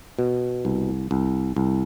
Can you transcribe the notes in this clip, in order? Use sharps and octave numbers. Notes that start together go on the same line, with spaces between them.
B2
C2
C2
C2